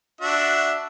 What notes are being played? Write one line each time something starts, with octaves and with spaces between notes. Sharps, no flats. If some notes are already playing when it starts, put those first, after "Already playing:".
D4 F#4 E5